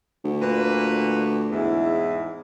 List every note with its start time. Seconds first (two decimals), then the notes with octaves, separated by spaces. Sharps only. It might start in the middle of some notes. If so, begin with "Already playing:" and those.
0.25 D2
0.41 A#2 B4
1.51 E2 G#2 E4